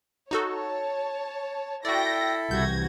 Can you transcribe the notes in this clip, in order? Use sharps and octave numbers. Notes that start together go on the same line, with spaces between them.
D#4 F#4 A4 C#5 A5
E4 F#4 A4 D5 G5 G6 A#6
C2 C3 E3 F#4 G6 G#6 A#6